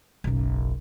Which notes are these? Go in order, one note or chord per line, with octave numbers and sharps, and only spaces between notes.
F#1 B1